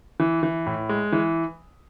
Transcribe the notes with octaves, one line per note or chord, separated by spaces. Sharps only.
E3
E3
A2
G#3
E3